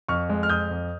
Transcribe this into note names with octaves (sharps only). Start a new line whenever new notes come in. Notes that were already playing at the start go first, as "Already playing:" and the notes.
F2 C#6 F6
G#3
F6
F2 D#6 G6
F2